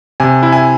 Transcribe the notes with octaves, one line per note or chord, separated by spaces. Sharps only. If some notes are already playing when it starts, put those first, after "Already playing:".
C3 G#5
E4
G#5